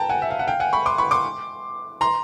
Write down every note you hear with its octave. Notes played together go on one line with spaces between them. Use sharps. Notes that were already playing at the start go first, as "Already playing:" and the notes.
Already playing: G5 A5 A#5
F#5 G#5
E5
F5
F#5
F5 G5
F#5 G#5
B5 C#6
C6 D6
B5 C#6
C6 D6
A#5 C6